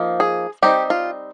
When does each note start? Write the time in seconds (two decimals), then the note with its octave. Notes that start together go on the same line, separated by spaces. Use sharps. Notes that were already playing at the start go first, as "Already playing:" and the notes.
Already playing: F3 A#3 D#4
0.20 G#4
0.62 G3 C4 D#4 G4
0.90 F4